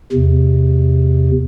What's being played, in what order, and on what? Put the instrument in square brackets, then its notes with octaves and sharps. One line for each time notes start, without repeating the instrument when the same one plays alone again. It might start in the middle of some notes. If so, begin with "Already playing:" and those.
[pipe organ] E2 C3